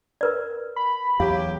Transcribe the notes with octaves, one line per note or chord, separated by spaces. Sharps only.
A#4 B4 D5
B5
E2 F#3 G4 F5